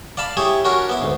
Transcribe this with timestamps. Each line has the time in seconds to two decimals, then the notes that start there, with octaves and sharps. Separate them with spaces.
0.17 D5 F5 A5 B5
0.37 E4 G4 G#4 C#5
0.65 C#4 D4 F#4 A#4
0.89 B3 E4
1.01 D2 G#2